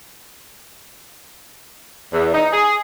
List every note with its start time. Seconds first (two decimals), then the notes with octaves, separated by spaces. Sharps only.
2.13 E2
2.34 D#4
2.53 G#4